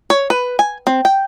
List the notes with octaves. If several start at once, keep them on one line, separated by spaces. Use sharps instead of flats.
C#5
B4
G#5
C4
G5